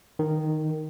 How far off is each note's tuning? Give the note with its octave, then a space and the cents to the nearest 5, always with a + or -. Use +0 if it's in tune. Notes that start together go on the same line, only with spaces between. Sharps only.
D#3 -5